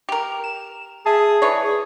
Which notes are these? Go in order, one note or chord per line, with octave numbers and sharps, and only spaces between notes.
G4 A#4
E7
G#4 E5 G#5 A5
E3 C#5 D5
G#4